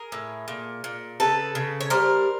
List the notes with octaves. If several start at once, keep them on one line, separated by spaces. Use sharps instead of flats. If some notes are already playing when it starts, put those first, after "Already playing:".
Already playing: G#4 A#4
A2
A#2
A#2
C#3 A4 B4
C#3
C#5
G3 A#4 C5